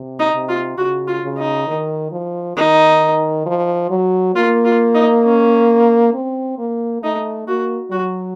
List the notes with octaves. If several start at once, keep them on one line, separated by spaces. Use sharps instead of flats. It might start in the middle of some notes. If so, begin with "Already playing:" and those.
Already playing: C3
D#4
C3
F4
C#3 F#4
F4
C#3
D#4
D#3
F3
D#3 D#4
F3
F#3
A#3 F4
F4
D#4
C#4
C4
A#3
A3 D#4
A#3 F#4
F#3 F#4